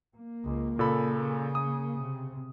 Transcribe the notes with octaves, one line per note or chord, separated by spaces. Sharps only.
A#3
C#2
A#2 C#3 A4 B5
D#6
C3